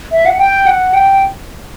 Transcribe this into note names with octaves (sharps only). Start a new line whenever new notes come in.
E5
F#5
G5
F#5
G5